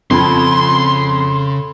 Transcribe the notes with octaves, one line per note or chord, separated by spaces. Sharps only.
F2 C#3 A4 B5 C6 G#6